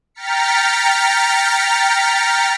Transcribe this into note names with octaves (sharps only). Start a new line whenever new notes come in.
G5 A#5 F6 A6 B6 C#7